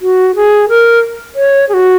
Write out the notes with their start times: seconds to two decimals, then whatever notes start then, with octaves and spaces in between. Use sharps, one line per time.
0.02 F#4
0.36 G#4
0.69 A#4
1.35 C#5
1.69 G#4
1.74 F#4